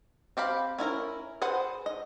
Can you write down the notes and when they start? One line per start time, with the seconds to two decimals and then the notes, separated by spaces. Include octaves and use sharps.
0.37 C4 G4 F5 B5
0.78 C#4 E4 F4 A#4
1.42 G#4 B4 C5 F#5
1.86 D#5